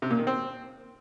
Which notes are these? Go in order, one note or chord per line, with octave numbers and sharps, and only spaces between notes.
C3
A#2
D#3
C4